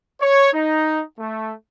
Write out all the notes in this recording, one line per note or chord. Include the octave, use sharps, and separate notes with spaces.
C#5
D#4
A3